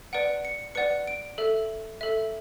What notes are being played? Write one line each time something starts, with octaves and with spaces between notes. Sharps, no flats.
B4 D5 F#5 D7
C#7
B4 D5 F#5 C#7
D7
A4 E5
A4 E5